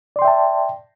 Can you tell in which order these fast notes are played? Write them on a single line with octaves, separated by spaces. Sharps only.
D5 C6 G5 E5 A5